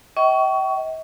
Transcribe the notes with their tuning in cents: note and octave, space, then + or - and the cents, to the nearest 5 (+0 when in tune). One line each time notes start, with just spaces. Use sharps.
D#5 +45 G5 -40 C#6 +25